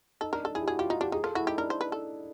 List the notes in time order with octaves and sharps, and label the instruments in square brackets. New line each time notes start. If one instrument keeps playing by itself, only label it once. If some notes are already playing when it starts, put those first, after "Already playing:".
[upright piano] D#4 [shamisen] A4
[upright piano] D4 [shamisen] A#4
[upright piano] D4 [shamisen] A4
[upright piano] E4 [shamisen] G#4
[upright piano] G4
[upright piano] F#4 [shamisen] G#4
[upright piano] F4 [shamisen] G4
[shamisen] D#4 [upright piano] F#4
[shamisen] D4 [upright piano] G4
[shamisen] D#4 [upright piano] G#4
[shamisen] F4 [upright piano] A4
[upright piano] E4 [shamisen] F#4
[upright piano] D#4 [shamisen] G4
[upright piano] D4 [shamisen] A#4
[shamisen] C5
B4
A4